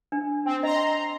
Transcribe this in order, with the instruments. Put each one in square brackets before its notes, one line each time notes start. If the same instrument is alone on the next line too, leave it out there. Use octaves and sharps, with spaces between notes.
[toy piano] D4
[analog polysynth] C4
[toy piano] D#5 [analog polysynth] A#5 C6